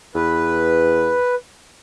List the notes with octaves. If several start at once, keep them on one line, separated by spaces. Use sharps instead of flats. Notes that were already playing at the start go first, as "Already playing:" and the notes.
E2 B4